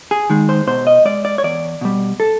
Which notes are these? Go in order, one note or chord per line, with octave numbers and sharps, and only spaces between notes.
G#4
D#3 G#3
C5
B2 C5
D#5
G#3 D5
D5
C#5
E2 D5
B2 G3
A4